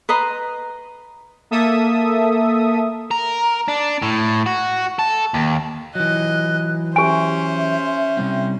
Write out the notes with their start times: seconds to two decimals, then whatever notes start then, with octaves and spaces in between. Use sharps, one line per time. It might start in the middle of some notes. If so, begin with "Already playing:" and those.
0.09 B4 D#5 A#5 C6
1.51 A#3 A4 E5 D#6
3.11 A#4
3.68 D4
4.02 A2
4.46 F#4
4.99 A4
5.34 D#2
5.95 E3 F#3 D#5 F#6
6.96 C#4 G4 C5 E5 G#5
8.17 C3 G3 C4